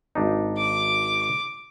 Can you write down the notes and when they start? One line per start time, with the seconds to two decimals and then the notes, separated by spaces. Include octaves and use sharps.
0.15 G#1 D4 D#4
0.57 D6